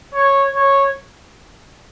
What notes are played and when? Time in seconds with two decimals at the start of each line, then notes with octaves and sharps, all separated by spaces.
0.14 C#5
0.55 C#5